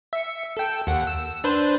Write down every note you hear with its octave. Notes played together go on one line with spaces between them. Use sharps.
E5 C#7
A4 G5
D#2 F#5
E6
D4 B4 C5